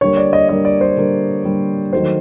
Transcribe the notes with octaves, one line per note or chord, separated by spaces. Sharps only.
D3 G3 A#3 C#5
D5
D#5
D3 G3 A#3 D#5
D5
C5
D3 G3 A#3
D3 G3 A#3
D#3 F#3 A3 C5